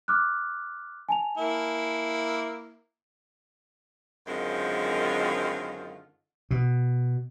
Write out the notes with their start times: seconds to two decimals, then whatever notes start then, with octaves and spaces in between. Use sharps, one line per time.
0.08 D6 F6 F#6
1.09 G#5 A5 F7
1.37 A#3 E4
4.27 F#2 D3 D#3 G#3 C4 F4
6.51 B2